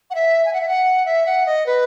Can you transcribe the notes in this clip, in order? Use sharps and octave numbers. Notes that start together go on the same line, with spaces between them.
F#5
E5
G#5
F#5
E5
F#5
E5
F#5
D#5
B4